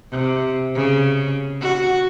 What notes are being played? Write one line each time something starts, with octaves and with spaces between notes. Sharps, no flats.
C3
C#3
F#4